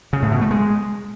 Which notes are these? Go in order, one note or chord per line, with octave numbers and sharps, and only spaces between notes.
C#3
A2
B2
A3
G#3